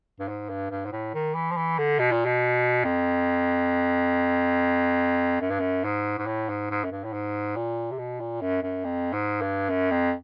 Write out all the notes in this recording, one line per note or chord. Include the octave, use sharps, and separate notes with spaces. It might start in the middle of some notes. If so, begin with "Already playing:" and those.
G2
G#2
G2
G2
G#2
A2
D#3
E3
F3
E3
D3
B2
A#2
B2
F2
F#2
G2
F#2
G#2
G#2
A2
G#2
G#2
F#2
G2
A2
G#2
A#2
C3
B2
A#2
F#2
F#2
F2
G#2
G2
F#2
F2